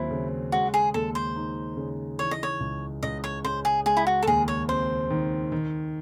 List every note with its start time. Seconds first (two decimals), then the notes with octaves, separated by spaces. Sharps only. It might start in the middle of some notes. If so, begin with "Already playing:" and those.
Already playing: D#2 F#3 C4 E4
0.11 C#3
0.52 G#3 F#4
0.74 G#4
0.94 D#2 A4
1.15 C5
1.36 D#4
1.77 C#3
2.19 E3 C#5
2.31 D#5
2.43 C#5
2.60 C#2
3.03 C#2 D#5
3.24 C#5
3.44 C#3 C5
3.65 G#4
3.86 G#3 G#4
3.97 E4
4.07 F#4
4.23 A4
4.27 D#2 G#4
4.48 C#5
4.69 C4 C5
5.10 D#3
5.52 D#3